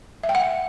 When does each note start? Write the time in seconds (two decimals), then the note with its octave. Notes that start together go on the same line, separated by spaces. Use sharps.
0.23 E5
0.29 G5
0.35 F#5